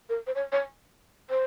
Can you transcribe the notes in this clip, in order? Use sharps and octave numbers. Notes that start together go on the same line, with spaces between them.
A#4
C5
C#5
C#5
C5